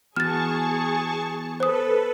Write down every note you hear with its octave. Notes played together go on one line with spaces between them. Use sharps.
E3 B3 F#4 G#4 A5 C#6 F6 A6
A4 B4 C5 D#6